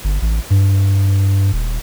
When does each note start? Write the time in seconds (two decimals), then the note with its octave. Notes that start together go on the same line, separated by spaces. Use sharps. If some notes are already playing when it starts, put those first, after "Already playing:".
0.04 G1
0.22 A1
0.50 G2
1.53 D#1